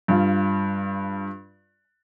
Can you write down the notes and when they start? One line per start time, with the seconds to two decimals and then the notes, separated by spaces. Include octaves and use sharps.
0.08 G2 F4